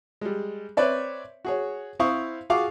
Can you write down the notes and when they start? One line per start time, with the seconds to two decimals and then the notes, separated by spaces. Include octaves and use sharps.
0.21 G3 G#3
0.77 C4 B4 C#5 D5 E5
1.45 F#4 G#4 C#5
2.00 C4 E4 C5 F5 C#6 D#6
2.50 F4 F#4 G#4 F5 C#6 D6